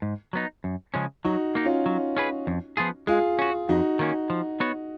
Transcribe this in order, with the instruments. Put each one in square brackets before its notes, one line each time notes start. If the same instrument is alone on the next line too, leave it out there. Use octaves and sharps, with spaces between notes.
[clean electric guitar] G#2
F#3 B3 D#4
F#2
C#3 F3 G#3 C#4
[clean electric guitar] F#3 [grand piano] D#4 F#4
[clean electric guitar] A#3 D#4
[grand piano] C#4 F4
[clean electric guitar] F#3
C#4 G#4 B4
F2
F3 B3 F4 G#4
[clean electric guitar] G#3 [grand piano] F4 G#4
[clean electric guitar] C#4 F#4
[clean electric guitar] F2 [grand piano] D#4 F#4
[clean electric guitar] D#3 A#3 C#4
F3
B3 F#4 C#5